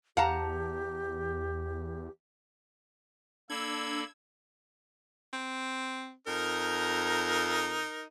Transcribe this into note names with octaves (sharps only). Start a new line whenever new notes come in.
E2 G4 F5 F#5 A5 A#5
A#3 D4 A4 B5 E6 G#6
C4
F2 D#4 A#4